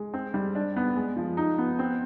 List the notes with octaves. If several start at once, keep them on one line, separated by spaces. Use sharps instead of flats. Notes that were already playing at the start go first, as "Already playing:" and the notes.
Already playing: G#3
C4
G3
D4
B3
G#3
F3
D#4
B3
C4